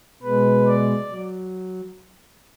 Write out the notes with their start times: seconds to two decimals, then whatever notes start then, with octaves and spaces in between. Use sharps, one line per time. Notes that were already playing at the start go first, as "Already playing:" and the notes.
0.23 B2 G#3 B4
0.67 D5
1.11 F#3